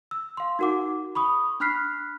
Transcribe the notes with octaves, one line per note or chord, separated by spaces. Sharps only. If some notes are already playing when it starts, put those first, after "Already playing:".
E6
F5 C6
D#4 F#4 A#4 F#5 D6
B5 C#6 D#6
D4 B5 F6 F#6 B6 C7